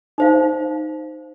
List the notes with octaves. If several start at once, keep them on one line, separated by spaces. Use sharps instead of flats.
D#4 C5 F5